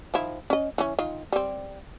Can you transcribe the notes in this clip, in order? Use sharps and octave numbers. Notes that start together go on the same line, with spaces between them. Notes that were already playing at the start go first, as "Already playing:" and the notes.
D#3 F3 E4
C#4 D#5
E3 C#4
D#3 F4
G3 C4